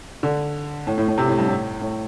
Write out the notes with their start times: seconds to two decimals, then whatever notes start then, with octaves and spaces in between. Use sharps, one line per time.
0.23 D3
0.87 A2
0.98 A2
1.08 A2
1.18 C3
1.28 A2
1.39 G2
1.48 A2
1.81 A2